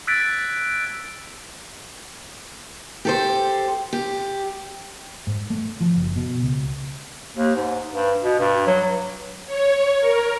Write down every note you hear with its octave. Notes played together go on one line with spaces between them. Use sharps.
E6 F#6 G#6 A6 B6 D7
G4 A4 C5
G4
G#2
A3
F3
F#1
B2
C#2
D#2
G#2
G2
B2
G2
F#3
C#5
A#4